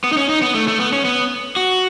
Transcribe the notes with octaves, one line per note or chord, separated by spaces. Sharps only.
B3
D#4
C#4
D#4
B3
A3
A3
B3
C#4
B3
F#4